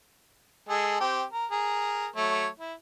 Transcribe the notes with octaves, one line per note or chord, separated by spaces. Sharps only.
G#3 G#4 A4
C4 G4
A#4
G#4 A#4
F#3 A3 C#5
E4